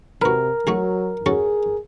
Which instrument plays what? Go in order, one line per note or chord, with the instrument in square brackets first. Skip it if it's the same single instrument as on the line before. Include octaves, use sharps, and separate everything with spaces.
[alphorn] C3 [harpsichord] F#4 B4 [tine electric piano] A#4
[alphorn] F#3 [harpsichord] A3 F#4 G#4
[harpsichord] C#4 F#4 A4 [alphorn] G#4